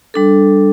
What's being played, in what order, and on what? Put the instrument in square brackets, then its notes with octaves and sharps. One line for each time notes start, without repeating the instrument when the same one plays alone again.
[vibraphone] G3 D4 A4